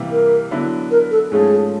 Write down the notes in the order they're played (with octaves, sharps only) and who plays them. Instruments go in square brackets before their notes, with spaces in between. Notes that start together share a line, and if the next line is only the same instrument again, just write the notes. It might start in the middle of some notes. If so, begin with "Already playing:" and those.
Already playing: [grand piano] C3 E3 G3 A#3
[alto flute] A#4
[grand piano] D3 F#3 B3 E4
[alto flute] A#4
A4
[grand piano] G#2 F3 A3 C#4 [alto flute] G#4